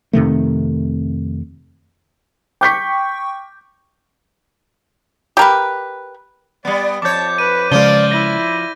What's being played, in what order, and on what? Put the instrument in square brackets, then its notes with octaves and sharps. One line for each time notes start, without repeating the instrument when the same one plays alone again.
[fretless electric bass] F2 C3 D#3 A3
[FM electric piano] G5 C#6 [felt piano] D6 G6 B6
[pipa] G4 A#4 B4
[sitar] G3 B3 [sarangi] D5
[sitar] F2 C#5 [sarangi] A5 [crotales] D6 G6
[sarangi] B4 [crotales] D#7
[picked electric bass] C#3 G#3 [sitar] F3 F4 [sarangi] D5 [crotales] G7
[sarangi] E4 [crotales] A#6 D#7 G7